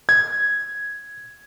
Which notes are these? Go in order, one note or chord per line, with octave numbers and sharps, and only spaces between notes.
G#6